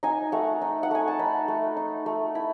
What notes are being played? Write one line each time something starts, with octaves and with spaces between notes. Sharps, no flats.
D#4 G#5
A3 F#5
D#4
F#5
A3 G#5
A5
D#4 B5
A3
D#4
A3
E4 B5